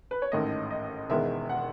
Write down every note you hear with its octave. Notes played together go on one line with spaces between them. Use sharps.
B4
C#5
A1 G#2 D#3 A3 D#5
D#5
E1 E2 D#3 G#3 B3 E5
F#5